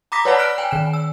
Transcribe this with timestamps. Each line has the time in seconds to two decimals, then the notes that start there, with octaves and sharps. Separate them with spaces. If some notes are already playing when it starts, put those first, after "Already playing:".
0.12 A#5 B5 D6 D#6 A#6 B6
0.25 B4 C#5 D5 F#5 A5 B5
0.38 F6 F#6 D7
0.58 G5 G#5
0.71 D#3 E7
0.93 E6